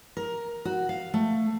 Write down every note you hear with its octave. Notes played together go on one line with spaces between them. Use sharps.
A#4
F#4
F5
A3